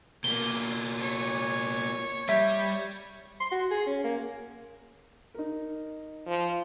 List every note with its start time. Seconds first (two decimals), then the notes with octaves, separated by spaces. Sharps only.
0.24 B2 A#3 G7
1.00 C#5
2.29 G3 E5
3.40 C6
3.52 F#4
3.71 G#4
3.87 C#4
4.03 A#3
5.34 D#4 A#4
6.27 F3